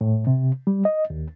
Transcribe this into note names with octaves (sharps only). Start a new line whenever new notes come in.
A2
C3
G3
D#5
D#2